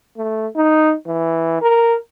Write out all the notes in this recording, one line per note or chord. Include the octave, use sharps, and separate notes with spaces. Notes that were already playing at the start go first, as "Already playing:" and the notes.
A3
D#4
E3
A#4